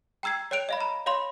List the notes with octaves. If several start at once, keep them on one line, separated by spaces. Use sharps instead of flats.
G5 A#5 E6 G#6 C7
C#5 G5 F#6 D7 F7
D#5 F5 B5
A#5 B5
C#5 F5 B5 C6